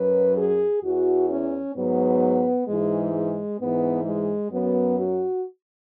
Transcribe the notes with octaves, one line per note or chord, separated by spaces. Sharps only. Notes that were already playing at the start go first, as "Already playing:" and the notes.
Already playing: F#2 F#3 B4
G#4
E2 E3 F#4
C#4
G#2 F#3 B3
G#2 E3 G#3
G#3
G#2 E3 B3
G#3
F#2 F#3 B3
F#4